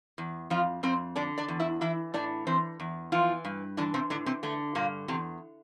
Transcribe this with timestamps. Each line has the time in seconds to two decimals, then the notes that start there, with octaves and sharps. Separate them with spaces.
0.18 E2
0.50 F2 F3 F4
0.83 F2 C4 C5
1.16 D3 D4 D5
1.38 D4 D5
1.48 E2
1.60 E4 E5
1.81 E3 E4 E5
2.14 A2 D4 D5
2.47 E3 C4 C5
2.80 E2
3.12 E3 F3 F4
3.45 G2
3.77 D3 E3 D4
3.94 C3 C4
4.10 A2 D3 D4
4.26 C3 C4
4.43 D3 A3
4.75 G2 A#2 A#3
5.08 E2 C3 C4